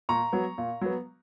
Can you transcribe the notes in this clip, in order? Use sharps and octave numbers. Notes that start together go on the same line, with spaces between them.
A#2 A#5 C#6
F#3 B3
A#2
F#3 B3